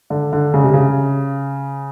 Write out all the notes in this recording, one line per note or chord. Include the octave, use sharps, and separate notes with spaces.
D3
D3
C#3
C3
C#3